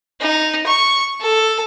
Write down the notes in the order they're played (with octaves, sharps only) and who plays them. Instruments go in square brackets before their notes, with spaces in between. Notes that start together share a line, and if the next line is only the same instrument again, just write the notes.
[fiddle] D#4
C#6
A4